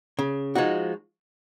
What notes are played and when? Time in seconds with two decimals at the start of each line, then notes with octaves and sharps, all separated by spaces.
0.19 C#3
0.55 F3 G#3 D#4 F#4